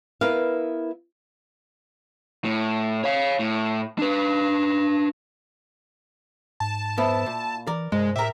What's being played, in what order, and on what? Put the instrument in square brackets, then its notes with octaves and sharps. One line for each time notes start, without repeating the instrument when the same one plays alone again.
[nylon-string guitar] B3 E4 A#4 B4 F5
[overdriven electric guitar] A2
C#5 F5
A2
D4 B4
[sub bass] G#2 [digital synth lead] A5
[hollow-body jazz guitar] F2 B3 [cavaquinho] E4
[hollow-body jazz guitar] A#2
[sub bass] E3 [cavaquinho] A#4 [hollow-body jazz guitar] D5
[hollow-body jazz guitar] C2 [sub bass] G2 [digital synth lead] G#3
[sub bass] A2 [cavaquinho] G4 A#4 [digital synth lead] E5